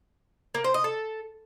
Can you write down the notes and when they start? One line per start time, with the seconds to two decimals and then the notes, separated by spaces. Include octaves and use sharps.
0.55 A#3
0.64 C5
0.74 D#5
0.84 A4